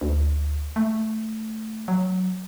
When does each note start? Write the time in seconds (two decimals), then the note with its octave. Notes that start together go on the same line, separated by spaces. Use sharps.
0.01 D2
0.76 A3
1.88 F#3